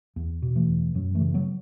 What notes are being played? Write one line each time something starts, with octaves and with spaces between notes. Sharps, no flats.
E2
B2
E3 A3
E2
F#2 F#3
E3 A3
C#3
F#3 B3